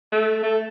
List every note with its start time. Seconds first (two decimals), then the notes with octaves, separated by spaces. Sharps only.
0.12 A3
0.43 A3